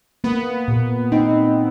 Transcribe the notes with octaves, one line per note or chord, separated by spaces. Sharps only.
A#3 B3
A#2
C4 D#4